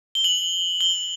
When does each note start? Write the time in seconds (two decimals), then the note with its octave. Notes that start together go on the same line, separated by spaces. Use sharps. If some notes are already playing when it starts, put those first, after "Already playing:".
0.15 G7
0.24 F#7
0.81 G7